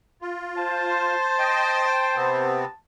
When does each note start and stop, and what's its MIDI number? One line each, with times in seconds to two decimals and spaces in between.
0.22 1.15 65
0.58 2.59 72
0.58 2.75 81
1.38 1.86 75
1.38 1.86 79
1.86 2.16 79
2.16 2.65 48
2.16 2.65 59
2.16 2.65 60